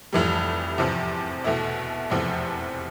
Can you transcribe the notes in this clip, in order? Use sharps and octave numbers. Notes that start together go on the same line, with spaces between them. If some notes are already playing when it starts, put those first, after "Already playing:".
F1 F2 E3 G3
E2 C3 F3
E2 B2 A3 E4
F1 E2 C3 F3